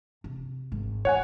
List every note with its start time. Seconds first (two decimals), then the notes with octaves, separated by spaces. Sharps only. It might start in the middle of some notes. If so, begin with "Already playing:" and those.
0.24 C3
0.72 G#1
1.05 F4 C#5 F#5 G#5